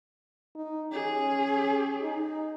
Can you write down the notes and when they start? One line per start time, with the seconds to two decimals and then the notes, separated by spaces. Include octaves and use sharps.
0.55 D#4
0.92 C#4 G#4
2.03 D#4